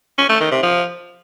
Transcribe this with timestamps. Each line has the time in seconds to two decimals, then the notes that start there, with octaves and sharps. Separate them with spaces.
0.18 C#4
0.29 A3
0.40 D#3
0.52 C3
0.63 F3